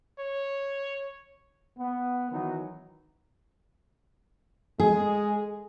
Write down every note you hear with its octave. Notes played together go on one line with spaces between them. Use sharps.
C#5
B3
D#3 E3 F#3 B3 D#4
G#3 G#4